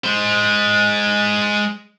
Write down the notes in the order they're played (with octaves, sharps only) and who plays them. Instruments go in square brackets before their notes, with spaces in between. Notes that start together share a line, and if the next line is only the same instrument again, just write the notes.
[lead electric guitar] G#3 C5